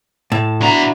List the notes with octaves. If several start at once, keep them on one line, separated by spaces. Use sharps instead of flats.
A2 A5
B2 D4 E4 F#4 A#5